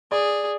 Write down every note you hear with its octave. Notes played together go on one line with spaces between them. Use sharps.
G#4 D5